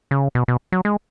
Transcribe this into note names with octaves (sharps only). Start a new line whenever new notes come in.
C#3
B2
B2
F#3
G#3